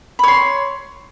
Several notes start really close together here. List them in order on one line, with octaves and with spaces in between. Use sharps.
B5 C#5 C6